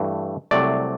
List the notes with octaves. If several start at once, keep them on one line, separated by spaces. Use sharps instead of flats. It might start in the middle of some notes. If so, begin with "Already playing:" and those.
Already playing: G2 E3 A3
C2 C3 F#3 A3 D5